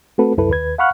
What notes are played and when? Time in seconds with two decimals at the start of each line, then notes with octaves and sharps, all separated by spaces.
0.18 A3 C4 F#4 A4 B4
0.37 C2 F#2 E4 A4 B4
0.49 D#2 B4 G#6
0.78 F5 F#5 B5 C#6 F6 F#6